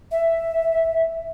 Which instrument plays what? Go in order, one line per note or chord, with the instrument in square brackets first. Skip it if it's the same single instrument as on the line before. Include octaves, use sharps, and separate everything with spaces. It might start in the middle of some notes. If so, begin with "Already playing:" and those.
[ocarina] E5